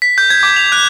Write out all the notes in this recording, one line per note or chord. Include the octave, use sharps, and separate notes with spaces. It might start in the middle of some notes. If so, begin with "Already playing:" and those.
B6
G6
G#6
D6
F7
F#6